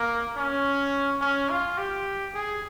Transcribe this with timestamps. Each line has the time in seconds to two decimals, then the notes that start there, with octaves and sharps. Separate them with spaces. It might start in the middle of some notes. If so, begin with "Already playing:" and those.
Already playing: A#3
0.36 C#4
1.21 C#4
1.49 F4
1.78 G4
2.34 G#4